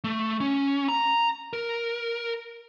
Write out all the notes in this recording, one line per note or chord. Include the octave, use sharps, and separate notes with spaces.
A3
C#4
A#5
A#4